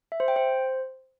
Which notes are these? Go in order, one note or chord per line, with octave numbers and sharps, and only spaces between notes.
E5
C5
G5
C5